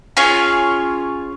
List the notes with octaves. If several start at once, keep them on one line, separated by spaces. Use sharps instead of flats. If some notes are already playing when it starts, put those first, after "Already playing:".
C#4 F4 G#4 C#5